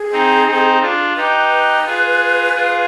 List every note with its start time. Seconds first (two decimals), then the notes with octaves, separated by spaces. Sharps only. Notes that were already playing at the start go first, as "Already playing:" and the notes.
Already playing: G#4
0.12 C4 D#4
0.47 C4 D#4
0.82 D4 F4
1.16 D#4 G4 B4
1.86 F4 G#4
2.55 F4 G#4